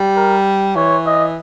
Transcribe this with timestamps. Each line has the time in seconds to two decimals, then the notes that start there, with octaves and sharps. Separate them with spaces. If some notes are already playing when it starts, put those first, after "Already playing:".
Already playing: G3
0.16 A#4
0.76 E3 C#5
1.06 D#5